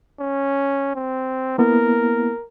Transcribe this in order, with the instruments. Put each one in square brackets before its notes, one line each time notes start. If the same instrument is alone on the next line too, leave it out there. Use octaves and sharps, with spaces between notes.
[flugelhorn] C#4
C4
[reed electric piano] A#3 B3 E4 [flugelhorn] A#4